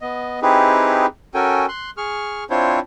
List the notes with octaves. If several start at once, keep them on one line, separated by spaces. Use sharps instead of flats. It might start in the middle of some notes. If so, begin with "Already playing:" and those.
B3 D#5
C4 D#4 E4 G4 G#4 B4
C#4 F#4 A4 A#4 G5 G#5
C6 F#6
G#4 C#6 F6
C4 D4 E4 F4 C5 C#5